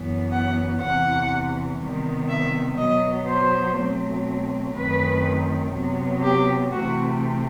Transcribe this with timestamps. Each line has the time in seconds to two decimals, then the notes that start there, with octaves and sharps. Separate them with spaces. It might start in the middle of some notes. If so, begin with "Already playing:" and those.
Already playing: F#2 E3 B3
0.32 F#5
0.81 E2 C3 E3 F#5
1.81 C3 D#3 G3 B3
2.29 E5
2.78 B2 F#3 B3 D#5
3.27 C5
3.77 B2 F#3 A3 C4
4.75 F#2 D#3 A3 C4 B4
5.74 C3 F#3 B3
6.22 G4
6.72 C3 E3 A3 C4 F#4